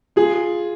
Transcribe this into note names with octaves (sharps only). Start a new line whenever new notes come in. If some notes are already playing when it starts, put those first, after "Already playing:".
F4 G#4